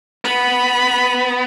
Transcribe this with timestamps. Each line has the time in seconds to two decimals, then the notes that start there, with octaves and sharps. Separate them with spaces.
0.25 B3 B5